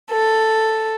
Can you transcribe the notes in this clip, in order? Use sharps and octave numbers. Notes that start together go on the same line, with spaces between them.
A4